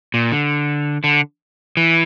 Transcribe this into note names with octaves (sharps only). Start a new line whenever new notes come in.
A#2
D3
D3
E3